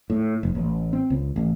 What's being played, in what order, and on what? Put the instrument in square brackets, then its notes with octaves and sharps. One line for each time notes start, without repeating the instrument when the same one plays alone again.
[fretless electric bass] A2
F1
A1
C4
C#2
A1